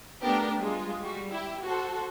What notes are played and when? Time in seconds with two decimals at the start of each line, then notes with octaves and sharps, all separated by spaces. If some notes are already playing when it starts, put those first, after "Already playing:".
0.22 A3 B3 D4 G4 A#4
0.59 G3 G#3 F4
1.00 G3 F#4
1.30 E4 G4
1.64 F#4 A4 C5